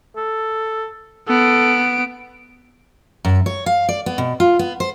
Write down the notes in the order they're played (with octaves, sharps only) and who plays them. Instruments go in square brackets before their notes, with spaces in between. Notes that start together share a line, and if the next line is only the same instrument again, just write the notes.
[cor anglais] A4
[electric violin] B3 D7 [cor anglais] A4
[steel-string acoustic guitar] F#2
C#5
F5
D5
B3
B2
F4
B3
C5